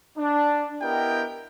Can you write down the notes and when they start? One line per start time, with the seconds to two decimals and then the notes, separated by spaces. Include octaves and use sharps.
0.18 D4
0.82 B3 E4 G4 A#4 D#5 G5